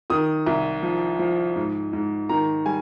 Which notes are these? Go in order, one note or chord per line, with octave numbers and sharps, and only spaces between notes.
D#3 D#6
C2
F3
F3
G#2
G#2
D#3 A#5
G3 G#5